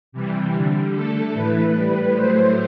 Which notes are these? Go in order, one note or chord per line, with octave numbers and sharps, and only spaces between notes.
C3 E3 G3
D3 G3
D3 A3 A4
A2 E3 A3 B4
A2 G3
A2 F#3 A3 C5